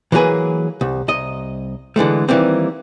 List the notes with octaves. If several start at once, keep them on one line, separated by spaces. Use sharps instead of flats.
E3 F#3 A#3 F4 G#4 B4
C2
C2 D#5
D3 E3 G#3 A3
D#3 E3 G3 A#3 C4